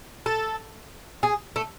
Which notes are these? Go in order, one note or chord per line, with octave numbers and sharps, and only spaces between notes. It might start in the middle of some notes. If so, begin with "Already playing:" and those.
A4
G#4
A3